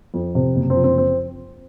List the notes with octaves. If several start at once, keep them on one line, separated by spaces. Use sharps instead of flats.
F2
C3
F#1
C4
F3
C4
C4